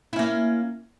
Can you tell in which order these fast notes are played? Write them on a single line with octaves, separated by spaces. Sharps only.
E4 C#4 A#3